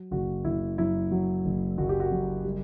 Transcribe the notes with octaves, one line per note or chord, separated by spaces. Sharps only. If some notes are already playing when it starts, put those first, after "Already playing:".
Already playing: F#3
F#1 F#4
F#1 E4
F#2 E4
F#3
F#1
F#1 F#4
G4
F#4
F#2
G3